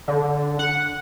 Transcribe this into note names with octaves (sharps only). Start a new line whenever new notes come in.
D3
F#5